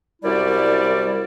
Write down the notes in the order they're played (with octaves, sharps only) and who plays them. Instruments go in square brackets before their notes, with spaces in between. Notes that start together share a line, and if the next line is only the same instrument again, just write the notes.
[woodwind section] C2 F#2 G3 E4 D5